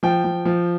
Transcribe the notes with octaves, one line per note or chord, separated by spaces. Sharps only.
F3 G5
F3
F3